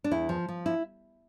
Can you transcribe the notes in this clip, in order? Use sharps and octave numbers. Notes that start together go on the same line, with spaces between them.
D4
E2 E4
F3
F3
E4